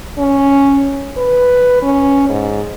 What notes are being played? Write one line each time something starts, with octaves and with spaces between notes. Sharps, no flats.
C#4
B4
C#4
G#2